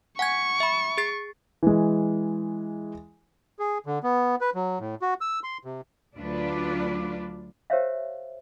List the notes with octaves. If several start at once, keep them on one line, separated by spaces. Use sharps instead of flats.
F#5 G#5 C#6 G#6
E5 B5
G#4 A6 C7
E3 G#3
G#4
D3
B3
B4
F#3
A2
F#4
E6
C6
C3
D2 F#3 D4 F4 B4 D5
G4 A#4 C5 C#5 E5 F5